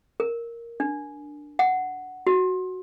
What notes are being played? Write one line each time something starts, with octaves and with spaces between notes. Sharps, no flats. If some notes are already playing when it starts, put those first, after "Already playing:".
A#4
D4
F#5
F#4